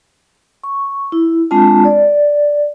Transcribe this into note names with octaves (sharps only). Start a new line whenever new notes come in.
C#6
E4
G#3 C4 D4 F4 A5
D5